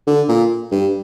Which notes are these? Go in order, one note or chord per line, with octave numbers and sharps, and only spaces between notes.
D3
A#2
G2